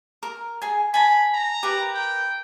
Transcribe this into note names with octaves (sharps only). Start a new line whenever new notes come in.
A#4
G#4 G#5
G#5 A5 B5
A#5
G4 A#4 B4
G5